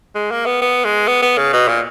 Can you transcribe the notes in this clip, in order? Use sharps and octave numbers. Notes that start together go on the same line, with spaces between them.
G#3
A#3
B3
B3
G#3
B3
B3
C#3
B2
A#2